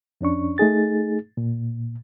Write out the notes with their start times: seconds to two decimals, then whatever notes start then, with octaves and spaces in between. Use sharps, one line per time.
0.21 F2 C#4 D4 C#6
0.58 A3 D#4 G#4 A6
1.37 A#2